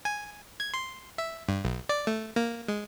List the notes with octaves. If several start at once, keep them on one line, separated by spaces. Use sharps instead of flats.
G#5
G#6
C6
E5
G2
B1
D5
A3
A#3
G#3